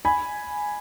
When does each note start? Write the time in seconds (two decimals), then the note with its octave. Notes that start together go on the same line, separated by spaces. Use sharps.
0.05 G#5 B5